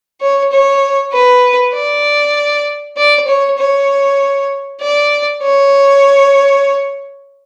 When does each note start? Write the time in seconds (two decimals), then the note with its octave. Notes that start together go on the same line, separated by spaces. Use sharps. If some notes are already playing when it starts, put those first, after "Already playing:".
0.21 C#5
0.52 C#5
1.13 B4
1.74 D5
2.97 D5
3.28 C#5
3.58 C#5
4.81 D5
5.43 C#5